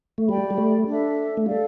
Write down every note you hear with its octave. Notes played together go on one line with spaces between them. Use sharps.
A3
G3 G4 D5 G5 B5
G3
A3
D4 A4 E5
A3
G3 A4 D5 F5